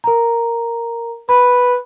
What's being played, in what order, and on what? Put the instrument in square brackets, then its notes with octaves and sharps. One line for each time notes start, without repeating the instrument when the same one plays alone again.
[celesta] A#4 A#5
[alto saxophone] B4 [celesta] B5